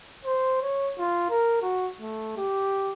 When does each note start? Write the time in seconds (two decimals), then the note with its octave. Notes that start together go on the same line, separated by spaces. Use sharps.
0.25 C5
0.62 C#5
0.99 F4
1.30 A#4
1.62 F#4
2.01 A3
2.37 G4